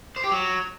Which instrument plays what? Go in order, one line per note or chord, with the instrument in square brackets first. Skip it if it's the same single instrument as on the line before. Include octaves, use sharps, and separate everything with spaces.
[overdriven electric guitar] C5
G4
F#3